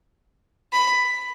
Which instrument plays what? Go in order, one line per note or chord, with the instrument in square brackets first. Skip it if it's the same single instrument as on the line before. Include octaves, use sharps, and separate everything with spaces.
[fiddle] B5